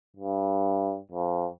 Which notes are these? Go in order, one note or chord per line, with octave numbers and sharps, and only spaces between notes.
G2
F2